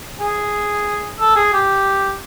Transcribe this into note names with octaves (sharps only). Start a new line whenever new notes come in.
G#4
A4
G#4
G4